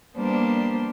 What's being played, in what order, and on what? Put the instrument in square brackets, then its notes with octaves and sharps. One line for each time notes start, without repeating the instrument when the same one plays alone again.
[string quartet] G3 A#3 B3 D4 C5